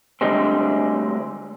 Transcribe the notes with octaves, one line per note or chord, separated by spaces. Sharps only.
D2 D3 G3 G#3 C4